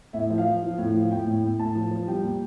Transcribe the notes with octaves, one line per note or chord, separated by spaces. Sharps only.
A2 E5
F3
F5
F3
F3
A2
F3
A2 G5
A2
A2
A2 A5
F3
F3
G3 G5
A#2